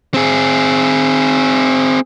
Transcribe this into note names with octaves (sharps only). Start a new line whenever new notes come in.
C4 G#4